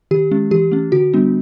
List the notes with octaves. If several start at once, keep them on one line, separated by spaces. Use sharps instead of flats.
D#3 G4
G#3 C#4
E3 G4
A3 C#4
D3 F#4
G3 B3 D4